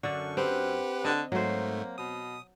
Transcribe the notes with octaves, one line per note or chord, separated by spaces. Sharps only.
F#2 D3 D4 A4 C#6
C4 G4 B4 F#5
D3 D#5
G#2 F#3 A3 A#3 C5
B2 D#6